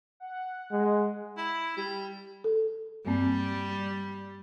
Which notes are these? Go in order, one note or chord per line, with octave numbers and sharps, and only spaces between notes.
F#5
G#3
E4
G3
A4
G2 G3 A#3 C4